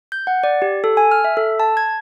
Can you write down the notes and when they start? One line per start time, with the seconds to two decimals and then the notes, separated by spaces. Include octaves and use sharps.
0.12 G6
0.27 F#5
0.43 D5
0.62 G4
0.84 A4
0.97 G#5
1.11 F6
1.24 E5
1.37 A4
1.60 A5
1.77 G#6